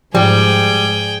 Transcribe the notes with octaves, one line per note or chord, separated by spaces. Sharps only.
G#2 F3 G3 G#4 G5